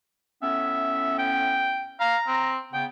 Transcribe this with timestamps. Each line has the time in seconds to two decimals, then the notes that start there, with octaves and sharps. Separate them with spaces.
0.43 A2 B3 C#4 E5
1.19 G5
2.00 F5 A#5
2.28 C4
2.73 C#3 B3 G5